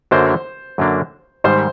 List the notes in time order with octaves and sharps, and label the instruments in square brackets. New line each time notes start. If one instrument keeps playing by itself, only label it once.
[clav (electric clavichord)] F#2 D3 F#3 A#3 D4 [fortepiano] C5
[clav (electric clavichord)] F#2 D3 F#3 A#3 D4
[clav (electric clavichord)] G#2 D#3 G3 [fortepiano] C5